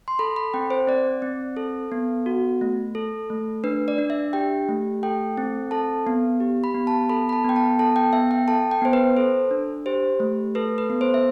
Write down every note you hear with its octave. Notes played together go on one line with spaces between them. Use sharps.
C6
A4 B5
B5
C4 G5
C5
C4 D5
C4
A4
B3
F#4
A3
A4
A3
D4 B4
D5
D4
E5
G4 G5
A3
A4 G5
C4
A4 A5
B3
G4
B5
B3
A5
A4 B5
B5
A5
B3 G5
A5
A4 A5
G5
B3 E5
G5
A4 A5
G5
B3 C5
B4
A4 C5
D4
G4 C5
A3
A4 B4
B4
B3
C5
E5